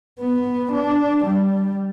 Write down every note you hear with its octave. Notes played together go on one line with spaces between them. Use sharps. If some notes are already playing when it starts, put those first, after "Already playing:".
B3
D4
G3